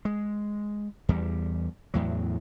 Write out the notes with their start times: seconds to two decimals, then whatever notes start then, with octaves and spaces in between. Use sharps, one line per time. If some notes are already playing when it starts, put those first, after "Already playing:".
0.05 G#3
1.09 E2 G3
1.94 E2 A2 F#3